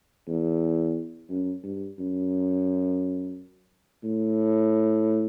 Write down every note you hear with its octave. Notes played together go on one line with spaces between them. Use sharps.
E2
F#2
G2
F#2
A2